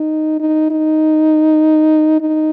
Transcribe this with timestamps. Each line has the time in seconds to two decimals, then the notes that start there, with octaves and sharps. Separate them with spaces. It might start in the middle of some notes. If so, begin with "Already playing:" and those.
Already playing: D#4
0.39 D#4
0.70 D#4
2.20 D#4